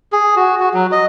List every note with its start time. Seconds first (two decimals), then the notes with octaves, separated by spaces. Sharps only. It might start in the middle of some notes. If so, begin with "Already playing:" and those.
0.12 G#4
0.36 F#4
0.60 F#4
0.74 F#3
0.92 D#5